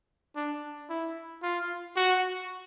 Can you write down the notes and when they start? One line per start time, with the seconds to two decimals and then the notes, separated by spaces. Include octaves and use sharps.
0.36 D4
0.89 E4
1.43 F4
1.96 F#4